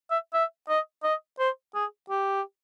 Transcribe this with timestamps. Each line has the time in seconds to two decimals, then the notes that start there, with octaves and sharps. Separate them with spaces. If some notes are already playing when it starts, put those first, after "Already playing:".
0.11 E5
0.33 E5
0.69 D#5
1.03 D#5
1.39 C5
1.74 G#4
2.10 G4